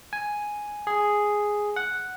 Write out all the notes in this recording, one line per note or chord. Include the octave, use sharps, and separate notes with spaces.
G#5
G#4
F#5